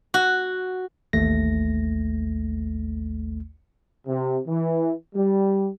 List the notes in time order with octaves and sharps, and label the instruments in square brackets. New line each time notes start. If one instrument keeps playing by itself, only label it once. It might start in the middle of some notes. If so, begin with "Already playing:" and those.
[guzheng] F#4
[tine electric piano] A1 D#2 A3 A#6
[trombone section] C3
E3
G3